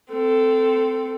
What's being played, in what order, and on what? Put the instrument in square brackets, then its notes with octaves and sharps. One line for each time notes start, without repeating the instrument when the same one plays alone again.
[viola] C4 A4